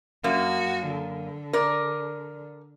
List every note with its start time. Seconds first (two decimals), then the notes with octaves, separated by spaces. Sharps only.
0.24 F#2 A#3 F#4
0.90 D3
1.53 A#4 D5